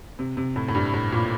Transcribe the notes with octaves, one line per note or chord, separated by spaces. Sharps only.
C3
C3
A2
A2
G2
A2
A#2